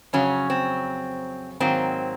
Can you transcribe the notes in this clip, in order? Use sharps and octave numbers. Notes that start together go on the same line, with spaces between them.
F2 C#3 F#3 C#4
C4
G#2 D#3 F#3 A#3 C4